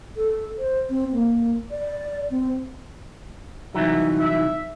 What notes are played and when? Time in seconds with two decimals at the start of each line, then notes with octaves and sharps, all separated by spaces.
0.17 A4
0.58 C5
0.90 C4
1.12 A#3
1.71 D5
2.31 C4
3.75 C2 E3 F#3 D#4 E5
4.19 E5